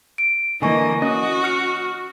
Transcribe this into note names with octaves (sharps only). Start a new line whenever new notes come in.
D7
D3 E3 A#3 D#5 G#5 C#6 A#6
C#4 F#4 D#5 D#6
F6 C#7